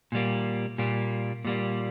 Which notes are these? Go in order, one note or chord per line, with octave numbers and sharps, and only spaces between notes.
A#2 G3 A#3
A#2 G3 A#3
A#2 G3 A#3